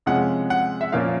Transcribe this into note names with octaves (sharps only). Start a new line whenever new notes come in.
C3 F3 G#3 C#4 F#5
F#5
E5
A#2 F3 A#3 C#4 F5